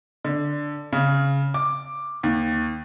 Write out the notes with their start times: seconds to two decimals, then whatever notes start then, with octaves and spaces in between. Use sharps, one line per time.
0.25 D3
0.93 C#3
1.54 D6
2.23 D#2